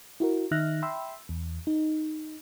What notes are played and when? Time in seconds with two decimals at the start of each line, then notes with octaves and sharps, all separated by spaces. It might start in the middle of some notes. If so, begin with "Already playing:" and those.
0.20 E4 F#4 A#4
0.51 D#3 D#4 E5 F6 F#6 A#6
0.82 E5 G5 B5 C6 E6
1.29 E2
1.67 D#4